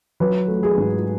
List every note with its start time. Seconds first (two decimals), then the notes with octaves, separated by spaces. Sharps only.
0.20 F#3 B4
0.48 A3
0.63 G#4
0.78 G#2